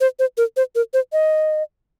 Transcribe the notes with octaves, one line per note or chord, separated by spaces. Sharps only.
C5
C5
A#4
C5
A#4
C5
D#5